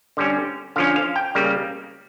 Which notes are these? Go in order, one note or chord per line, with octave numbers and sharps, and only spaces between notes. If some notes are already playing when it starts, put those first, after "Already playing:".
D3 G3 C#4
D3 F3 C#4 F5
F5
G5
C#3 G3 A#3